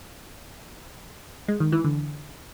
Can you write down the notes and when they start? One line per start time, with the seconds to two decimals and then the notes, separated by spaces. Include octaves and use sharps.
1.48 G#3
1.60 D#3
1.72 E3
1.84 D3